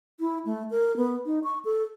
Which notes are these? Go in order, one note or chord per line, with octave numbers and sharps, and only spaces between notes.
E4
A3
A#4
B3
D#4
C#6
A4